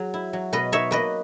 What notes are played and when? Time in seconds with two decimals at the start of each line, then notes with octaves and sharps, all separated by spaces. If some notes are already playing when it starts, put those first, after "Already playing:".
Already playing: F#3 G#4
0.14 E4
0.33 F#3
0.53 B2 B4 D#5
0.72 D#4 C#5 E5
0.91 A#3 B4 D#5